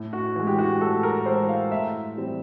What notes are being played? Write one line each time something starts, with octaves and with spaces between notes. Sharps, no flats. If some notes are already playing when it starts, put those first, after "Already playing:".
Already playing: A2
F#4
E3 G#3
G4
F#4
A2 A4
A#4
E3 G#3 C5
F5
A2 E5
E3 G3 C4